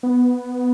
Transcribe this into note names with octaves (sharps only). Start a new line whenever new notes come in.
B3